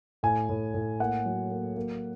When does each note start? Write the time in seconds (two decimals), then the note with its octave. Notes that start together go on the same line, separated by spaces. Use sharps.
0.23 A2 G#5
0.49 A2
0.74 A2
1.00 A#3 F#5
1.25 F#3
1.51 A#3
1.76 A#3